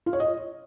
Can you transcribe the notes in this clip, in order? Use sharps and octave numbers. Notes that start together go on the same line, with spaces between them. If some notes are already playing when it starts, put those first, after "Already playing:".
F4
C#5
D#5